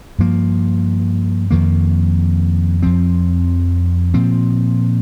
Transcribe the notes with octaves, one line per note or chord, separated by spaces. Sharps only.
G2 F3 A#3
F2 D#3 A#3
F2 F3 C4
A#2 F3 C4